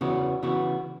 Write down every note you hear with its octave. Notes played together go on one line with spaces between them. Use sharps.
E2 C#3 E3 B3 F#4
C#3 E3 B3 F#4